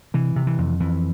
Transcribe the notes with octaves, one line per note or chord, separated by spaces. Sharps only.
C3 E3
C3
E3
F2
F2 E3